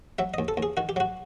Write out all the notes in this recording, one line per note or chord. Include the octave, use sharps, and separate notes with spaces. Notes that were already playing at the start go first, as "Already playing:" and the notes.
F#3 E5
D#2 D#5
A4
D#2
G#4
D#3 F#4
G4
F#3 F#4